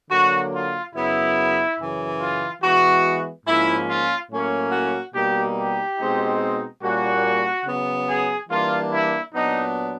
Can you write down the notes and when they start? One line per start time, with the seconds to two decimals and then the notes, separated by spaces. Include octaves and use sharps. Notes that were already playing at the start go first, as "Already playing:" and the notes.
0.11 D3 F#3 A#3 F#4
0.53 F4
0.95 F#2 C#3 F#3 B3 E4
1.78 F#2 C#3 E3
2.20 F4
2.62 E3 G#3 B3 F#4
3.46 G#2 F3 A#3 C#4 E4
3.88 F4
4.30 A2 F#3 A#3 C#4
4.72 F#4
5.14 B2 G3 A#3 D#4 G4
5.56 G4
5.98 B2 G#3 C4 D#4
6.82 A#2 G3 A#3 C#4 F#4
7.65 C#3 F#3 B3
8.07 G#4
8.49 E3 G3 A#3 D4 F4
8.91 E4
9.33 A#2 F#3 B3 D4 D#4